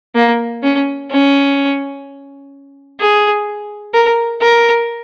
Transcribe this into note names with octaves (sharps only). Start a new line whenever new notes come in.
A#3
C#4
C#4
G#4
A#4
A#4